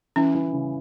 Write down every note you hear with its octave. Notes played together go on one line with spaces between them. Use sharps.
E3 C#4
E3
C#3